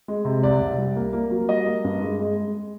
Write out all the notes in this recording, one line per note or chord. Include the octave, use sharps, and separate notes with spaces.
G#3
C3
C2 D5
C2
G3
A#3
A#3
F#3
G3 D#5
A#3
G2
G#3
G#3
G#3